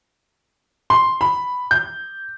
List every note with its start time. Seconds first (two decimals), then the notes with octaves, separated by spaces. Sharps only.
0.90 C6
1.21 B5
1.71 G6